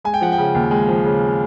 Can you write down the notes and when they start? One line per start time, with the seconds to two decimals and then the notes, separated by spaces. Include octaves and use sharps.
0.04 G#3 G#5
0.14 G5
0.21 F3 F#5
0.32 G5
0.38 C#3
0.55 D#2
0.71 G#3
0.88 F3
1.05 C#3